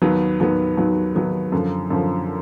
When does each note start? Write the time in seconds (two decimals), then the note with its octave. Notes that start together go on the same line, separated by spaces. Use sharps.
0.02 D#2 D#3 F#3 B3
0.40 D#2 D#3 F#3 B3
0.77 D#2 D#3 F#3 B3
1.15 D#2 D#3 F#3 B3
1.52 F#2 D3 F3
1.90 F#2 D3 F3